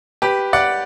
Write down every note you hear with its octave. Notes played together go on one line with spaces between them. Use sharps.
G4 B4
D5 F#5